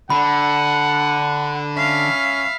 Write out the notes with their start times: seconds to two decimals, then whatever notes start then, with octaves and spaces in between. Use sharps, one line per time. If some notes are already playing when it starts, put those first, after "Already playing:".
0.10 D3 F#5 B5
1.76 C#4 E5 F5